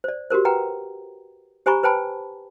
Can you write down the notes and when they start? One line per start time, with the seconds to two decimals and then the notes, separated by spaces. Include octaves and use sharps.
0.04 C5 D5
0.30 F#4 G4 A#4 C5
0.45 B4 F#5 G5 A#5
1.66 G4 C5 G#5 A#5 B5 C#6
1.83 B4 C5 G5 A5 B5